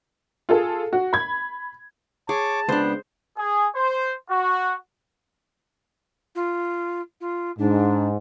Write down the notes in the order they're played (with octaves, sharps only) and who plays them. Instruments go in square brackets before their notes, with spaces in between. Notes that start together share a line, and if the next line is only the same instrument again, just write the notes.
[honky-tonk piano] F4 G#4 A4
F#4
B5 G#6
[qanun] G#4 [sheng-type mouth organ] C#5 D6 [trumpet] A5
[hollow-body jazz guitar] C#2 D4 [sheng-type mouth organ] B3 [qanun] C5
[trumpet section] G#4
C5
F#4
[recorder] F4
F4
[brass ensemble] G#2 [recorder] D4